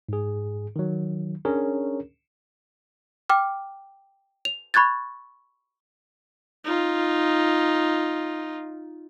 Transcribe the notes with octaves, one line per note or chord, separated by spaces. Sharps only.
G#2 G#4
D#3 F#3
C#4 D4 G#4 A#4 C#5
G5 D6 F6
F7
B5 C#6 F#6 G#6 A6
D#4 F4